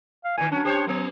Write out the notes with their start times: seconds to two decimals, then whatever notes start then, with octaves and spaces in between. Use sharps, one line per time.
0.25 F5
0.38 A#2 D#3 G#5
0.52 F#3 C#4 D4
0.65 G4 C5 C#5
0.87 F#3 A#3 B3